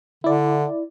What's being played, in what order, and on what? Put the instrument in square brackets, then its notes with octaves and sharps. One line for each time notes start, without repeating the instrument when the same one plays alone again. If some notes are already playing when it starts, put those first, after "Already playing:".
[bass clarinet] D3 [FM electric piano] E4 D5